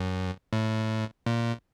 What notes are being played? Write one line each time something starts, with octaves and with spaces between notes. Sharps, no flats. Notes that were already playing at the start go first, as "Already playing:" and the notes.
Already playing: F#2
A2
A#2